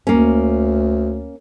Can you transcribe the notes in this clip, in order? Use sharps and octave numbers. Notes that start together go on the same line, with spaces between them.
D2 A#3 C#4